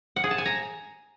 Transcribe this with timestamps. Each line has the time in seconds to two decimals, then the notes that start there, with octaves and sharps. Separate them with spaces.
0.16 F#5
0.24 G#4
0.31 A5
0.38 G#5
0.46 A#5